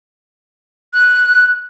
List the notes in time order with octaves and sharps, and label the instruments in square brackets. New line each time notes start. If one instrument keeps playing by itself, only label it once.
[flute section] F#6